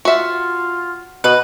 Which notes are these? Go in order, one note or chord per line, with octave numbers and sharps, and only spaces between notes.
F4 F#4 E5
B2 B4 D#5